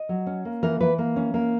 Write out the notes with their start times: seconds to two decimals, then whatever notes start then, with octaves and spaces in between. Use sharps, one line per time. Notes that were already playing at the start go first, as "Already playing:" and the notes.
Already playing: D#5
0.09 F#3
0.27 C#4
0.45 A#3
0.62 E3 A#4
0.80 E3 B4
0.98 A#3
1.16 C#4
1.34 A#3